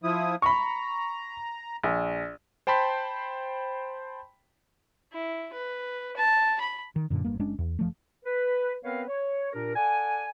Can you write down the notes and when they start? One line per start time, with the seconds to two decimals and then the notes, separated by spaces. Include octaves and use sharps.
0.04 F3 E4 D#6
0.42 A#5 B5 C#6
1.84 A#1
2.67 C5 G5 A5 B5 C6 B6
5.13 E4
5.54 B4
6.16 A5
6.60 B5
6.96 D#3
7.10 F#2 A#2 D3
7.24 F#1 G2 A#3
7.39 F#1 G#3 C#4 D4
7.58 E2
7.79 F#1 F3 A3
8.25 B4
8.84 B3 C4 A#4 B4 C#5 F5
9.08 C#5
9.53 A#2 D4 G4 A#4
9.75 A4 D5 F#5 G#5